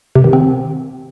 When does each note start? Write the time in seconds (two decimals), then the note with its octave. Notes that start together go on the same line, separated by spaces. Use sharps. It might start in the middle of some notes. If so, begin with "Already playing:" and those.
0.15 C3
0.24 D#3
0.33 C4